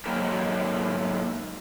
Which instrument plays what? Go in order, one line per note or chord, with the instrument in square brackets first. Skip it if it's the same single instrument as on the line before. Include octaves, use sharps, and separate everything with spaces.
[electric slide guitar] G#2 D3 F#3 A#3 G4 A#4